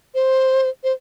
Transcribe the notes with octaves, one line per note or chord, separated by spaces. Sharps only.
C5
C5